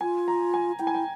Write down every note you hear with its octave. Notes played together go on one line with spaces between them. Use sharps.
F4 G#5
A#5
G#5
E4 G5
G#5
G5